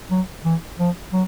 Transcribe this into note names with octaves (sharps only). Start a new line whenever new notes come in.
F#3
E3
F3
F#3